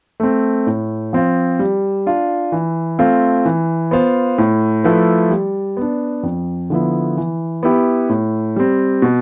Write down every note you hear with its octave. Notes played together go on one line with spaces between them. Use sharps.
A3 C4
A2
F3 C4 F4
G3
D4 F4
E3
A3 C4 F4
E3
B3 F4 C5 F5
A2
F3 A3 E4 B4
G3
B3 D4
F2
D3 F3 B3 E4
E3
B3 E4 G4
A2
G3 C4
B2